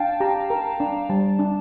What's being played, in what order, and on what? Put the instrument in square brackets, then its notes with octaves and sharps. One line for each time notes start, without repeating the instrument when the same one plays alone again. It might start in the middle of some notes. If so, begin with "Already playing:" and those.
Already playing: [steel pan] D4 [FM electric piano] F5 G5 A5
[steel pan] G4 [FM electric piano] A#5
[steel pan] A#4
D4
[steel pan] G3 [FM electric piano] A5
[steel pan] D4